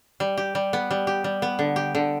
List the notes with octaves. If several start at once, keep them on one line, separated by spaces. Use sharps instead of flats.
G3
G4
G3
B3
G3
G4
G3
B3
D3
G4
D3